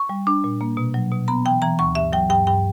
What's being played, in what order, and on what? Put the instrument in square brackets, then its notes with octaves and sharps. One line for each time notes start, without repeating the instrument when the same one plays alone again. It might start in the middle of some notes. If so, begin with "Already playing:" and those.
Already playing: [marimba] C#6
G3
D4
A#2
A#3
B2
F#3
B2
B3 A#5
E3 G5
E3 A#5
D2 C#6
G2 E5
F#3 G5
G2 G5
G2 G5